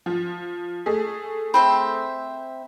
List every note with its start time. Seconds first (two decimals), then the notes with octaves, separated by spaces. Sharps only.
0.06 F3
0.86 A3 G#4
1.54 C4 C5 E5 B5